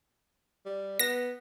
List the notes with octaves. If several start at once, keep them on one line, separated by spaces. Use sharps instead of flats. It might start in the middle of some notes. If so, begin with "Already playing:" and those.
G3
B3 A#6